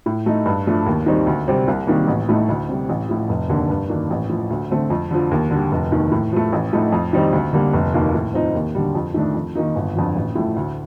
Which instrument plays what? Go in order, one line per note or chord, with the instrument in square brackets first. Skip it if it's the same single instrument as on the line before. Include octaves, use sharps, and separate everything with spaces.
[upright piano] A2
A3 D#4
G2
F3 A3 D4
D#2
D#3 G3 C4 D#4
D2
C3 G3 C4
C2
C3 D#3 G3 A#3
A1
A2 A3 D#4
D2
C3 G3
A1
A2 F3
F1
D#2 D3
G2
D#3 A#3 D4
A1
A2 F3
D2
D3 A3 C4
F2
D3 F3
D#2
D3 G3
F1
D#2 D#3
A2
F3 A3
A1
A2 F3 A3 D#4
F2
D#3 G3 C4 D#4
D2
D3 G3 A#3
F1
D#2 D#3 A#3
A2
F3 C4 D#4
D#2
D3 G3
F2
D#3 A3 D4
F2
D#3 A#3 D#4
G1
F2 D3 F3
A1
A2 F3 A3
D2